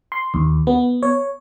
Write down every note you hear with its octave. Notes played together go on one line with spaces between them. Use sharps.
C6
D#2
B3
C#5